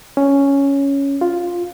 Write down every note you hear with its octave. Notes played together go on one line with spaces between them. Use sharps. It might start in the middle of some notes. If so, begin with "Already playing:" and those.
C#4
F4